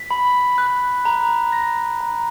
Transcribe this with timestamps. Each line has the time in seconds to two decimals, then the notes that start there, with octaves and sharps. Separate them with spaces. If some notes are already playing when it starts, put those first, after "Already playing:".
Already playing: B6
0.11 B5
0.58 F#6
1.05 A#5
1.52 A#6
2.00 A#5